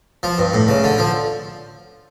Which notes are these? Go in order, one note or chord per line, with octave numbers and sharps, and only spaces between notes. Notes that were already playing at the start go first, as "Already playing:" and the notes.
F3
G2
A2
C#3
D3
F3